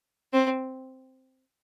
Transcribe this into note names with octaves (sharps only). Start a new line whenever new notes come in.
C4